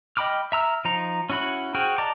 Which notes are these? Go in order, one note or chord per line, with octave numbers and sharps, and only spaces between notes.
D#5 G5 B5 D6 F6
E5 A#5 E6 F6
F3 D#4 A#5
C#4 E4 F#4 F#5 B5
F#4 G#4 C5 G5 F6
D5 D#5 A5 A#5 D6